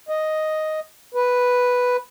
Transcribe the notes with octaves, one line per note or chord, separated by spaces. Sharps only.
D#5
B4